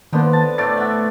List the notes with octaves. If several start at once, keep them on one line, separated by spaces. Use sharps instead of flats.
D3 D#3 A#3 B3 C5
A5
A2 A3 D5 A6
E5 F#5